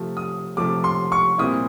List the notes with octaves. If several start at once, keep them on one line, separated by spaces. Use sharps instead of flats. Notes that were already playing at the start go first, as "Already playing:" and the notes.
Already playing: C3 F3 A3
D#6
C3 F3 A3 D6
C6
C#6
A#2 G3 C4 E4 D#6